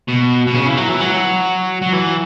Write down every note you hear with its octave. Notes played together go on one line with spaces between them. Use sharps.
B2
B2
C#3
E3
F#3
E3
F#3
F#3
E3